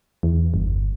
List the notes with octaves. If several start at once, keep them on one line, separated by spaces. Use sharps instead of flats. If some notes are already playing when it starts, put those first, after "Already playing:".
E2
G1